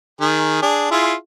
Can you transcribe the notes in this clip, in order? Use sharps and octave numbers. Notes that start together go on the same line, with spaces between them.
D#3 G#4
D4 G#4
E4 F4 G#4